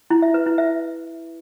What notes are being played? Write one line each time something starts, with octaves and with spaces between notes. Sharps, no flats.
E4
E5
B4
E4
E5